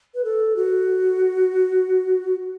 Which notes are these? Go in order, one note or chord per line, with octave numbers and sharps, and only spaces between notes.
B4
A4
F#4